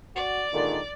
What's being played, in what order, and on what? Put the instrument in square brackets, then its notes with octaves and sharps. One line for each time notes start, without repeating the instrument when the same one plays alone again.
[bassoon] F#4 [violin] D5
[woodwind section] A#2 D3 D#3 [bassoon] G#3